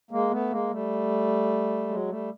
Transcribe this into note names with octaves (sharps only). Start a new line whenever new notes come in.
G#3 A#3
A3 B3
G#3 A#3
G3 A3
F#3 G#3
G3 A3